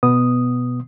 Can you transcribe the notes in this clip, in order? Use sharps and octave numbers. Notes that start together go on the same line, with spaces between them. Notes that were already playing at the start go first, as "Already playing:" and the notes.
B2 B3 D#6